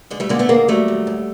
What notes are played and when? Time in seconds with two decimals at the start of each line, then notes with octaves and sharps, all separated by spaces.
0.10 D3 G#3
0.20 G3 A3
0.29 D3 G#3 A#3
0.39 A3 B3
0.49 D#2 G#3 A#3
0.68 F#3 G3 A3
0.88 D#2
1.07 D#2